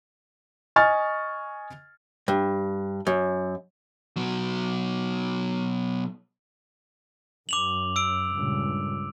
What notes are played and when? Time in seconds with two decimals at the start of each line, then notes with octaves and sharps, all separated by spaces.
0.76 D#5 G#5 C#6 F6 A6
2.28 G2
3.07 F#2
4.16 B2 F#3
7.49 F#2 D6 F7 F#7
7.96 E6 D7
8.33 C#2 G2 A#2